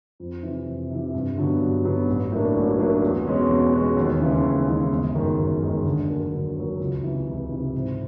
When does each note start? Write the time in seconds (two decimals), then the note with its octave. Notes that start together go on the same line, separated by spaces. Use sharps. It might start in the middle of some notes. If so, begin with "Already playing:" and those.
0.20 F2
0.43 C3 E3
0.67 F2
0.90 C3 E3
1.14 G2
1.37 D3 F#3 B3
1.61 G2
1.85 D3 F#3 B3
2.08 A1
2.32 A2 F#3 A#3 D4
2.55 A1
2.79 A2 F#3 A#3 D4
3.02 E2
3.26 B2 G#3 C#4 F#4
3.49 E2
3.73 B2 G#3 C#4 F#4
3.97 D#2
4.21 C#3 E3 G#3
4.43 D#2
4.67 C#3 E3 G#3
4.91 G1
5.15 F#2 D#3 G#3
5.38 G1
5.62 F#2 D#3 G#3
5.85 D3
6.09 F#3 A#3
6.33 D3
6.56 F#3 A#3
6.79 C#2
7.03 C3 E3
7.27 C#2
7.51 C3 E3
7.74 G#2